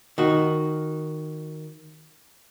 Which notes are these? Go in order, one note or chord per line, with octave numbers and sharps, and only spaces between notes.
D#3 F#4